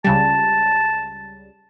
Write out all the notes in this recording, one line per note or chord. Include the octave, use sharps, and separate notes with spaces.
C#2 C#3 G3 A5